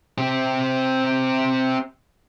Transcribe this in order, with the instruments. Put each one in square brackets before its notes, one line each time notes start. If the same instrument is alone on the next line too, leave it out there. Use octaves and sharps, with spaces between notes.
[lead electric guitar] C4 G4